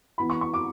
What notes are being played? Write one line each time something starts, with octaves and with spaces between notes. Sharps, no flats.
E3 B3 E4 B5
C#6
C#6
D6